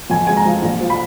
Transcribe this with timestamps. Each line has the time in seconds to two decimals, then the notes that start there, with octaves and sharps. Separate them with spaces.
0.10 F2 G#5
0.27 G#3 G#5
0.37 A#5
0.46 F3
0.62 A#1
0.81 F3
0.90 B5